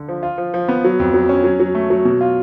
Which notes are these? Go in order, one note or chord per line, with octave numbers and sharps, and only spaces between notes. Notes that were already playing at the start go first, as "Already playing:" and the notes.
Already playing: D3
F3
F4
F3
F3
B3
F#3
F2
F#3
C#4
F#3
F#3
A3
F#3
B2
F4